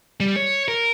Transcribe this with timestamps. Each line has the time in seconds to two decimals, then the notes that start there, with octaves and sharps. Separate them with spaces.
0.20 G3
0.36 C#5
0.68 A#4